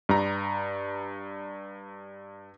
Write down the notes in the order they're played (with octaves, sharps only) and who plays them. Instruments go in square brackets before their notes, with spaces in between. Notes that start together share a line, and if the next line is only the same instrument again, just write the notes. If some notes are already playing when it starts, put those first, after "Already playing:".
[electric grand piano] G2 A#5